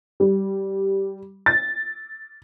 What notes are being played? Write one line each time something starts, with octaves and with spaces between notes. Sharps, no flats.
G3
A6